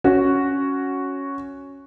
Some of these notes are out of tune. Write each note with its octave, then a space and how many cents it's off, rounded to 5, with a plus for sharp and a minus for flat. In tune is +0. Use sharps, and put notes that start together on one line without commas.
C#4 +0 F#4 +0